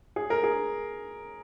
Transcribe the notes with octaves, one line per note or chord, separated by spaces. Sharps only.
G#4
A#4
G#4